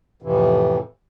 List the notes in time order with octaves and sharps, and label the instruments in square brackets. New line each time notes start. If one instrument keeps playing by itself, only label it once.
[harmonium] F2 A2 C3 E3